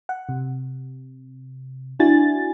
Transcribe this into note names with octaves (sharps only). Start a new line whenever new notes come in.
F#5
C3
D4 E4 F#4 G#5 A6